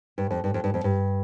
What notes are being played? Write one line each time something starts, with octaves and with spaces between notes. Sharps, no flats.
G2
F2
G2
F2
G2
F2
G2